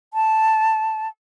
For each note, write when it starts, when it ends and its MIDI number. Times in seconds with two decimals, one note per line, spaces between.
0.13 1.08 81